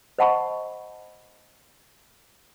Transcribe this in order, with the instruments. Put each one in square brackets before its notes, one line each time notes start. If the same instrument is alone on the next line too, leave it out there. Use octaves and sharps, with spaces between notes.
[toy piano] C5 D#5 F#5 A5 B5 C#6